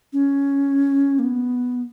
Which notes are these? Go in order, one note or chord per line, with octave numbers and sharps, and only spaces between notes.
C#4
A#3
B3